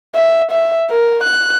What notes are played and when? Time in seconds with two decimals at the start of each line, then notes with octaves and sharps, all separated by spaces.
0.15 E5
0.51 E5
0.91 A#4
1.24 F#6